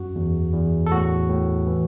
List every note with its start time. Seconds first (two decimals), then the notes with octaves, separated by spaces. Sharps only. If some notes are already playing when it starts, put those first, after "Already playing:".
Already playing: F#2 F#4
0.15 E2
0.54 E2
0.86 A4
0.92 A2 F#4
1.29 A2
1.67 E3